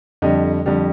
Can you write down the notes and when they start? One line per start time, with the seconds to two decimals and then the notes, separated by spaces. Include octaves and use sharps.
0.22 F2 D3 G3 D#5
0.66 F2 D3 G3